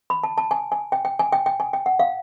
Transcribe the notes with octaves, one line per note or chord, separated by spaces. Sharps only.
B5
A5
A5
G#5
G#5
G5
G5
G#5
G5
G5
G#5
G5
F#5
F5